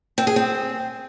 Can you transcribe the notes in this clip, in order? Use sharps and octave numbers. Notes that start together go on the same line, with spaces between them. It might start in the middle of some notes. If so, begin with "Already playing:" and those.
C4
G#4
C4